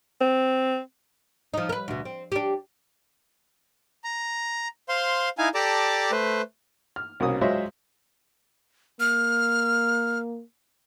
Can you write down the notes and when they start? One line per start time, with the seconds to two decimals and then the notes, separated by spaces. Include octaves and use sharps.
0.21 C4
1.54 F3 D#4
1.69 A#4 B4
1.88 D2 B2
2.05 C4
2.32 D4 G4
4.04 A#5
4.89 C5 F5 C6
5.38 D#4 E4 F5 G#5
5.54 G4 A4 D5 A5 A#5 D6
6.11 A3 B4 C5
6.96 F6
7.20 C2 B2 A#3 C#4 D#6
7.41 F#3 G#3 F4 C5 C#5 E5
9.00 A#3 F6